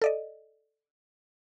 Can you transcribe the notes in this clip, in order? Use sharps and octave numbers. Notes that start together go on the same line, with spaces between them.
A4 D5 D#5